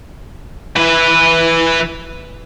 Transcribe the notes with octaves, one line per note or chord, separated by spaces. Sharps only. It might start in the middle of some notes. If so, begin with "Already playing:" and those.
E3 B4